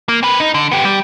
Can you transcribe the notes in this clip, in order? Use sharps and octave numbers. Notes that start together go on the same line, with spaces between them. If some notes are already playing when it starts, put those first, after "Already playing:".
A#3
C4 B4
D#4
D3
B3 G4
G3